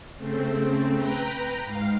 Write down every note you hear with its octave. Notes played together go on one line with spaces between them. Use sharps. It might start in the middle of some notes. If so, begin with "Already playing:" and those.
C#3 A3 C4
B4 G5 A#5
G#2 F5